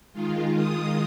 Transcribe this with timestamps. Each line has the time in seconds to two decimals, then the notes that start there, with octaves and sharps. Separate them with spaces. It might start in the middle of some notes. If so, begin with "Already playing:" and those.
0.13 D#3 G#3 F4
0.56 D#6